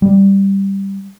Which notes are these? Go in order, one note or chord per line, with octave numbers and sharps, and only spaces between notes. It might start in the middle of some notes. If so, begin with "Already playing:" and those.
G3